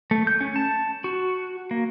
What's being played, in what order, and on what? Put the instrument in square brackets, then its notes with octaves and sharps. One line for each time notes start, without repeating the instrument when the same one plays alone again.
[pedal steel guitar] A3
G6
C#4
A5
F#4
A#3